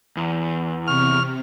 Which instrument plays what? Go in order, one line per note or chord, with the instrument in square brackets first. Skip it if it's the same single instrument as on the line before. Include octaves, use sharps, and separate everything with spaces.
[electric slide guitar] E2
[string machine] C3 [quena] C#6 [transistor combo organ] F6